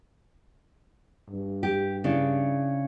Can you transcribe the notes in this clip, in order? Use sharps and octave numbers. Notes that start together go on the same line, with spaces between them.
G2
G4
C#3 D4 E4